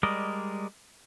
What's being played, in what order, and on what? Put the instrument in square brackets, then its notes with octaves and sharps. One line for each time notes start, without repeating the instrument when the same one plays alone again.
[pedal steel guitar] G3 G#3 A#4 D5 D#5